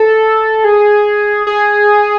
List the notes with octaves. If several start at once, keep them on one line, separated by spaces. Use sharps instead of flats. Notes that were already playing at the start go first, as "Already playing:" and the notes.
Already playing: A4
G#4
G#4